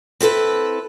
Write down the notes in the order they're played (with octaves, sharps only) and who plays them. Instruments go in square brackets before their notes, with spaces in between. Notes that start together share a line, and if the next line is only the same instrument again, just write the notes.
[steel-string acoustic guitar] C4 E4 A4 B4